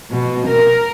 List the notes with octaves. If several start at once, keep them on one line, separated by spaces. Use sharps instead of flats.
B2
A#4